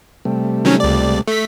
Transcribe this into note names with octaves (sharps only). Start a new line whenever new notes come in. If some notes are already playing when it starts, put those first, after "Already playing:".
C3 G3 A3
D#3 F#3 C#4
C#2 D5
A3 B6